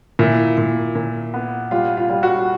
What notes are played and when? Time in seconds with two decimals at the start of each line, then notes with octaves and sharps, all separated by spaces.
0.19 A#2 E4
0.58 A#2
0.95 A#2
1.34 B3
1.71 G3 F4
1.97 F4
2.09 G3
2.23 F#4